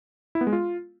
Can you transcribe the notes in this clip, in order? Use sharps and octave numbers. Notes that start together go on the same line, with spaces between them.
E4
B3
G#3
F4